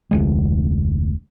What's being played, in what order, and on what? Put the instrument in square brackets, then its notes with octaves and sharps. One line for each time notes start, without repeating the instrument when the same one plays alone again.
[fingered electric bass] F1 D2 G#3